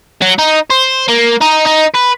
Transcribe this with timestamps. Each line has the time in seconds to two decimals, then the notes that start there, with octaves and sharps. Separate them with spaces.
0.22 F#3
0.39 D#4
0.70 C5
1.08 A#3
1.41 D#4
1.67 D#4
1.95 B4